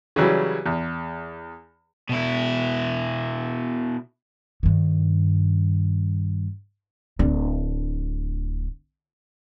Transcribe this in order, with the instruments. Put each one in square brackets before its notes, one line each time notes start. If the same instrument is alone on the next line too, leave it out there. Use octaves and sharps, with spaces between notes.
[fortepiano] C#3 E3 F#3 G3
E2
[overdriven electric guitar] B2 E4
[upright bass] G2 D#3
D1 D4